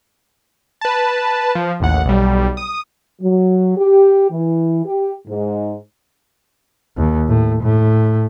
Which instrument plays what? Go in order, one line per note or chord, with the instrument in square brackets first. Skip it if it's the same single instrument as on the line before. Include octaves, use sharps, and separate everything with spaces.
[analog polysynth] B4 A5
F3
A1 D#2 F#5
B1 G3
D#6
[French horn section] F#3
G4
E3
G4
G#2
[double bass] D#2
A2
A2